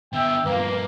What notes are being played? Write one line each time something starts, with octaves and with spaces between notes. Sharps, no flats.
D3 B3 E5 G5
G2 F3 A#3 B4